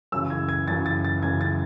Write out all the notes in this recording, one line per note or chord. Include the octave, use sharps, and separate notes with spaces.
F#2 C#3 E3 E6
G#6
G#6
F#2 C#3 E3 A6
A6
A6
F#2 C#3 E3 G#6
A6